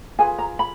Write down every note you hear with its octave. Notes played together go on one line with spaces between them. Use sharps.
F4 G#4 B4 G#5
A#5
B5